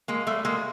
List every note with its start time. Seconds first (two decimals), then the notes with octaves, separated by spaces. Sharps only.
0.08 G#3 A#3
0.27 G3 A3
0.45 G#3 A#3